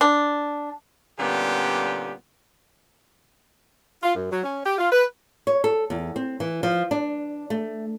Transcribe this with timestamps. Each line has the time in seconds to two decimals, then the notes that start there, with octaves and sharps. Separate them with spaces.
0.01 D4
1.19 A#2 D3 G3 B3 C#4 G4
4.03 F4
4.15 F#2
4.31 F#3
4.44 C#4
4.66 G4
4.78 F4
4.92 B4
5.47 C#5
5.64 A4
5.90 E2
6.16 C4
6.40 E3
6.63 F3
6.91 D4
7.50 A3